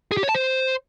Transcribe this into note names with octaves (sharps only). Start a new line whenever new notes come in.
G#4
G4
C#5
A5
C5